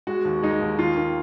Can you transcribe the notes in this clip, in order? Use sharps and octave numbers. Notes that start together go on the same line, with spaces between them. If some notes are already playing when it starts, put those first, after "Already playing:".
G#3 F#4
D#2
G#3 D#4
D#2
D#3 F4
D#3